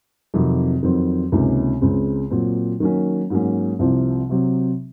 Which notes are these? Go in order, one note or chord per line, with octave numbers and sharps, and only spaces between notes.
F2 C3 D#3 F#3
F2 D#3 F#3 C4
C#2 C3 D#3 A#3 C#4
C#2 C#3 G#3 C4
A#2 F#3 C4
D#3 F#3 A#3 C#4
G#2 F#3 A#3 C#4
C2 C3 F3 C4
C3 F#3 C4